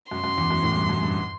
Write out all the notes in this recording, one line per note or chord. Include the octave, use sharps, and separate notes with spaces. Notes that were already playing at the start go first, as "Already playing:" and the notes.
F#2 C6
F#2
E2
F#2
A2
G2
F#2
G2